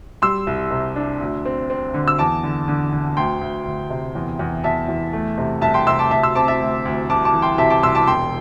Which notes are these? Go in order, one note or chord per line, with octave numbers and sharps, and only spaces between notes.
G3 C6 E6
C2
C3
D4
D2
C4
C4
D3
E6
E2 A5 D6
D3
D3
D3
D2 G5 C6
D2
D2
C3
E2
E2
E2 E5 A5
E2
A3
C3
C2 E5 A5
G5 C6
C3 C6 E6
A5 D6
D2 E5 A5
C6 E6
C4 A5 D6
E5 A5
D2
D2
C2 A5 D6
A5 D6
E3
G5 C6
C3 E5 A5
A5 D6
C2 C6 E6
A5 D6
E1 G5 C6